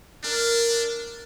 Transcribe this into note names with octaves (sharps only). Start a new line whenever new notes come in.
D4 A#4